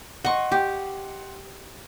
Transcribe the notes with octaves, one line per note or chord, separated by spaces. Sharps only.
D#5 F#5 C6 C#6
G4